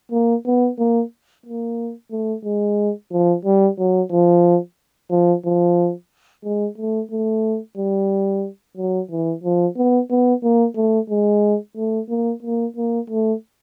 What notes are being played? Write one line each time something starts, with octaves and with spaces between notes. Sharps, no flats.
A#3
B3
A#3
A#3
A3
G#3
F3
G3
F#3
F3
F3
F3
G#3
A3
A3
G3
F#3
E3
F3
B3
B3
A#3
A3
G#3
A3
A#3
A#3
A#3
A3